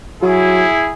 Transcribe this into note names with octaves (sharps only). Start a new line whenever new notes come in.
F#3 E4 G#4